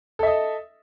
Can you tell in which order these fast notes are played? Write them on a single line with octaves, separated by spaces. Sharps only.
A4 E5 D#5